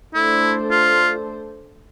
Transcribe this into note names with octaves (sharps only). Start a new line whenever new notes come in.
A3 D4 E4 A4 C5
F4